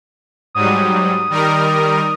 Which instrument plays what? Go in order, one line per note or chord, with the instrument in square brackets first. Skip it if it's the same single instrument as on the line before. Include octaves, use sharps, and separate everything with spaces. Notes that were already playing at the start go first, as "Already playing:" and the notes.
[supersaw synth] G#2 F#3 G3 [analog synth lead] D#6
[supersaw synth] D#3 G3 A#4